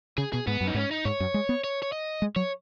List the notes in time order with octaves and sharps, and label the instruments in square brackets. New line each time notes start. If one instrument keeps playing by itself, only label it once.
[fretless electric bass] C#3 [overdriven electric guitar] G#4
[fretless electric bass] B2 [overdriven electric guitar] G#4
[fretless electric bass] G#2 [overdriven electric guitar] B3
[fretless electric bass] F#2
[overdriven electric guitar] D#4
[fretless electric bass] G#2 [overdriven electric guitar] C#4
[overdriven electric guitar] D#4
[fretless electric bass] G#2 [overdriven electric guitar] C#5
[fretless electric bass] F#2
G#3
B3
[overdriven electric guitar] C#5
C#5
D#5
[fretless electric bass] G#3
[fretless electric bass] F#3 [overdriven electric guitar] C#5